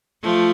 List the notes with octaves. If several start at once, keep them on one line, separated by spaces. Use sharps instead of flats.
F3 A3